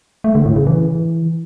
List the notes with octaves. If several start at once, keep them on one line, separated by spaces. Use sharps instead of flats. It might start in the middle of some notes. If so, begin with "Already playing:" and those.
A3
D3
A2
C#3
E3